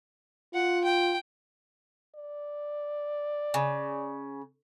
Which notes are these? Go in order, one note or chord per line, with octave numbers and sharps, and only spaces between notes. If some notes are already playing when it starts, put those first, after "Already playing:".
F4 F#5
G5
D5
C#3